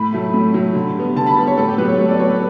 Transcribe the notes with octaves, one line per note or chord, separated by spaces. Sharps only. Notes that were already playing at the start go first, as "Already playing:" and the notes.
Already playing: A2 B5
F#3 A3
A2
F#3 A3
D3
G3 B3
D3 A5
B5
G3 B3 A5
C#5
A2 A4
G4
F#3 B3 B4
C#5
A2 C#5
D5
F#3 B3 C#5
B4